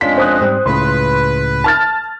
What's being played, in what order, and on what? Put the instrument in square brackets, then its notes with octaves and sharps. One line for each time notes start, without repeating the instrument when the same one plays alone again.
[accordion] F2 G#3 [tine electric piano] C#4 D4 F4 [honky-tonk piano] B6
[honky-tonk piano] C5 D#6 F#6
[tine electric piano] G#2 G3 C4
[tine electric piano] C#2 A2 C#3 [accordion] B4 [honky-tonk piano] C6
[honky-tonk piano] A5 F6 A6